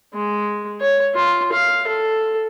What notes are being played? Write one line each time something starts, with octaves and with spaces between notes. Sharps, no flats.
G#3
C#5
F4
F5
A4